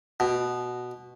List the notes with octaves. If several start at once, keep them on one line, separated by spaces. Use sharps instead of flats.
B2